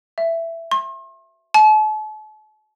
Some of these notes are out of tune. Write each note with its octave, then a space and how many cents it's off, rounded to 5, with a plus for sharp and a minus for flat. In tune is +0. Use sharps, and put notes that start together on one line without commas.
E5 +10
C6 +40
A5 -40